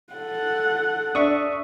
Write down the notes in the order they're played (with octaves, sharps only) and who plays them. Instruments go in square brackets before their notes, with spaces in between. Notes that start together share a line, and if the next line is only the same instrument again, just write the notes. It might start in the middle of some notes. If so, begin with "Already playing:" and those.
[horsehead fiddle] A4 F#5
[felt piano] D4 [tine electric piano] E5 C#6 D#6